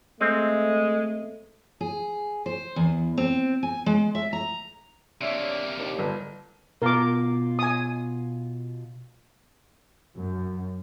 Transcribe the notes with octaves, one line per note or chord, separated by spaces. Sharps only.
G#3 A3 C4
G#4
C5
E2
C4
G#5
G#3
E5
A#5
C3 A#3 D4 C#5 E5
D#2 D4
G1
B2 F4 A#4 D6
G#5 D#6
F#2